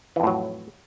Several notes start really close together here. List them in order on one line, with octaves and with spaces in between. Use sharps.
E3 F2 A2 F#3